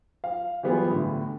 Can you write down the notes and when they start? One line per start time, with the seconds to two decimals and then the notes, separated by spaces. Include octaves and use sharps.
0.24 F5
0.63 E3 F#3 G3 B3 F4 G#4
0.91 A2 D3